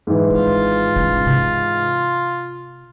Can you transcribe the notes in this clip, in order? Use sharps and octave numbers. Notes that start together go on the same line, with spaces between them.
G#2 E3
G#1 F4
D#3 C#4
C3